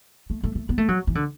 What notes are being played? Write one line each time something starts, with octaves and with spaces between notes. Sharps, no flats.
A3
A3
A3
B3
A3
F#3
E3
D3